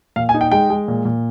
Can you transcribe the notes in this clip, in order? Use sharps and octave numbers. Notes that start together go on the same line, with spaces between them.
A#2 F5
G#5
D#4
G5
G#3 G5
G#3
A#2
A#2